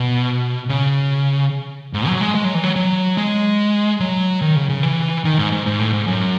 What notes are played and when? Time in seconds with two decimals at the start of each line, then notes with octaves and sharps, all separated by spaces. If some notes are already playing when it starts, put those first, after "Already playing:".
Already playing: B2
0.69 C#3
1.93 G#2
2.07 F#3
2.21 G#3
2.35 G#3
2.45 F#3
2.54 E3
2.64 F#3
2.76 F#3
3.17 G#3
4.00 F#3
4.42 D#3
4.56 C#3
4.69 C#3
4.83 E3
5.25 D#3
5.38 G#2
5.52 G#2
5.66 G#2
5.80 A2
5.93 G#2
6.07 F#2